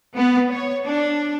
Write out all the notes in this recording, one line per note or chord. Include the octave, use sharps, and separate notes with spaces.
B3
C#5
D4